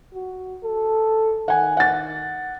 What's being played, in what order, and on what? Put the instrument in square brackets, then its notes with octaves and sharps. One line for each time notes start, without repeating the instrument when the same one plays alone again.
[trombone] F#4
A4
[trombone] D#3 [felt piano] F#5 G#5
[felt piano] F#5 A6